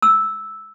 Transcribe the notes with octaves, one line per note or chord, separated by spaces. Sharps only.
E6